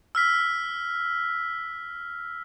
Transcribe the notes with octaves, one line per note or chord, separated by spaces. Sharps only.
E6 F6 B6